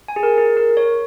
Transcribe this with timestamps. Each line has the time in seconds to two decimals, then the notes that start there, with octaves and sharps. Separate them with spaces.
0.08 G#5
0.16 G#4
0.23 A#4
0.38 G#4
0.57 A#4
0.77 C#5